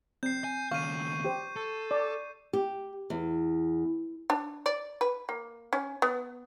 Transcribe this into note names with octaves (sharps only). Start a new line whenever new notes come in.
C4 G6 C7
G#5
D#2 C#3 F5 C#6 D#7
G4 C5
A4
D5
G4
E2
D4
D5
B4
A#3
C#4
B3